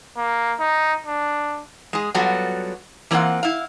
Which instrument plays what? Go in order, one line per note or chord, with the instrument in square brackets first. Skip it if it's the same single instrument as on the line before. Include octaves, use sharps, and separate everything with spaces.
[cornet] A#3
D#4
D4
[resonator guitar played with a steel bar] G#3 G#4
F#3 G3 B3 F4 F#4 A4
E3 A#3 C4 D4 F4 F#5
E4 F5